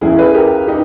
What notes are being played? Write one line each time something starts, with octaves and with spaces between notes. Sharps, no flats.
C#2 C#3 E3 E4 G#4
G#4 B4
G4 A#4
D#4 G4